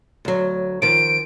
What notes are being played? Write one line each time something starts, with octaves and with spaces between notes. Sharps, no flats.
D2 F#3
D#3 F3 D7